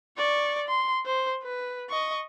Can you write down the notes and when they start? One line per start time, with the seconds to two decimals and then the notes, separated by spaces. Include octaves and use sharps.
0.18 D5 C#6
0.68 C6
1.05 C5
1.43 B4
1.90 D#5 C#6